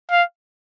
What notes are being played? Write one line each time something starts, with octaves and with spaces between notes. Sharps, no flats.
F5